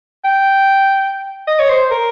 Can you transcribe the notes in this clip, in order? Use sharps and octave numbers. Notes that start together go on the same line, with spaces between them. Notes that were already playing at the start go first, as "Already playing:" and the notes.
G5
D#5
C#5
C5
A#4